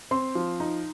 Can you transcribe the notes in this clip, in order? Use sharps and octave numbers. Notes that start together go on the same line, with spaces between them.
C4 C6
F3
D#4